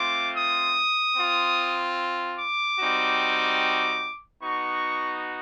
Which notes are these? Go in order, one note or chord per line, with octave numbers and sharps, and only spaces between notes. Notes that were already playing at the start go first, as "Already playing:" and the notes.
Already playing: A3 C4 F4 D6
D#6
C4 F4
D6
G3 C4 D#4 F#4
B3 D#4 F#4 C#6